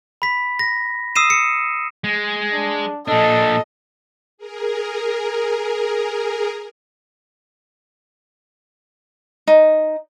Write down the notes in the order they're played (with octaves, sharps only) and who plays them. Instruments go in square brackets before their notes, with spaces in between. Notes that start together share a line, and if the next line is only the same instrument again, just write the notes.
[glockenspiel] B5 B6
A#6
D#6 E6 C7 D#7 E7
C#7
[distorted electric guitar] G#3
[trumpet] D4
[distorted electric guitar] A#2 D4 [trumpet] A4 [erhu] D#5
[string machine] G#4 A#4
[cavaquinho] D#4